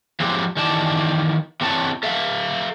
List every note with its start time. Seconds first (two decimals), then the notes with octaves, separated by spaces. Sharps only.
0.20 F3 F#3 G#3 C4 E4 G4
0.57 D#3 E3 G4 D5 A5
1.61 C3 E3 C4 C#5 A5
2.03 A4 E5 F5